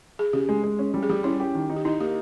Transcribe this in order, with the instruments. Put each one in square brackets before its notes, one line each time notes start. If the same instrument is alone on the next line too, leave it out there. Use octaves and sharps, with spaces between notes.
[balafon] G#4
[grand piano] C#3 [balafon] G4
[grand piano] G#3
G#3
C#4
G3
[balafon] G#4
[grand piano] G3 [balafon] G4
[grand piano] C#4 [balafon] E4
[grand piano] G4
D#3
D#4
[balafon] G4
[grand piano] D#4 [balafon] E4
[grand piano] A#3 [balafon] G4